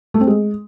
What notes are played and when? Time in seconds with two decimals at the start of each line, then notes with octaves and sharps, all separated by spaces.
0.14 A3
0.21 C4
0.27 G#3